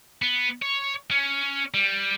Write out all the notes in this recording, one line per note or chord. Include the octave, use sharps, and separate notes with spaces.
B3
C#5
C#4
G3